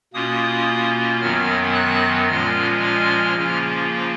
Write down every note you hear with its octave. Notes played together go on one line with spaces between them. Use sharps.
B2 A#3 C#4 F4 D#6
F#2 D#3 F#3 B3 F6
F#6
A#2 F3 G#3 C#4 F4 F6
F6
C#3 F3 A#3 C#4 F4